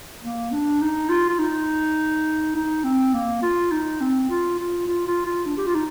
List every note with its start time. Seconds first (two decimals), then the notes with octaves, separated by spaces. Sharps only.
0.23 A#3
0.52 D4
0.81 D#4
1.09 F4
1.29 F4
1.39 D#4
2.55 D#4
2.84 C4
3.14 A#3
3.42 F4
3.72 D#4
4.00 C4
4.29 F4
4.59 F4
4.87 F4
5.07 F4
5.26 F4
5.46 D4
5.57 G4
5.66 F4
5.75 D#4